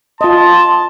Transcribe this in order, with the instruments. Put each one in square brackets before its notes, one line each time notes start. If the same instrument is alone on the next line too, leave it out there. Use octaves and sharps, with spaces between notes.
[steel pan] F4 D#5 [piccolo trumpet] A5 [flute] C6